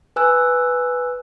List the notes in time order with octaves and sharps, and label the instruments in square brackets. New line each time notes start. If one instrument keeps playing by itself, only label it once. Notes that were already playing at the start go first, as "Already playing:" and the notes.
[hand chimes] B4 G#5 E6 F#6